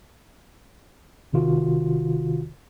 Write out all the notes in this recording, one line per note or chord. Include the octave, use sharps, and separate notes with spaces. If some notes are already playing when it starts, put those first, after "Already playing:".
G#1 C3 D#3 F4 F#4